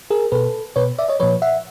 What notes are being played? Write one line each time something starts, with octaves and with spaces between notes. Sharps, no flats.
G#4 A#4
B2 A4 B4
B2 B4 C#5
D5 E5
C#5 D#5
A#2 F3 B4 C#5
E5 F#5